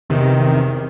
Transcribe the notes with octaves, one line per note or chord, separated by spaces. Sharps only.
E2 C3 D#3